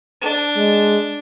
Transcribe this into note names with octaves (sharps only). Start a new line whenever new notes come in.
D4
G#3